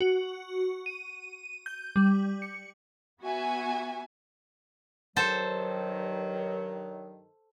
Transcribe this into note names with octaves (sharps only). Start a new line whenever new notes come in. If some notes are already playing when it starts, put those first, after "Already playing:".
F#4
D#7
G6
G3
C#7
B3 F#4 E5 G#5
G2 D#3 F#3 A4 C5